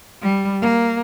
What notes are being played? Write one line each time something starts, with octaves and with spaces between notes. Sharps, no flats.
G3
A#3